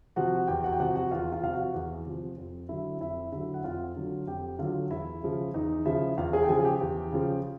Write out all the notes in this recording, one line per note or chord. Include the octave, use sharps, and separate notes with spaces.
C3 F3 F#4 F#5
E2 G4 G5
F#4 F#5
G5
C3 F3 F#4 F#5
F#4 F#5
E2 F4 F5
F4 F5
C3 F3 F5
F#4 F#5
E2
C3 F3
F2
D3 F#3 E4 E5
F2 E4 E5
D3 F#3 E4 E5
F#5
F2 F4 F5
D3 F#3
F2 G4 G5
D3 F#3 F4 F5
E2 E4 E5
C#3 F3
E2 D#4 D#5
C#3 F3 E4 E5
E2 F4 F5
G#4 G#5
G5
C#3 F3 G#4 G#5
G4 G5
E2
C#3 F3